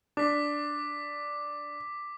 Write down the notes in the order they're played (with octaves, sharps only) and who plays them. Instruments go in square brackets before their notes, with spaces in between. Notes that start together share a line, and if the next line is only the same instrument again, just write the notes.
[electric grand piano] D4 [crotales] D6 B6